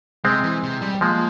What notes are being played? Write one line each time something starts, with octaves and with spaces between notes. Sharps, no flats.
C3 G#3 C4
E3
C3
G3
F3 G#3 A#3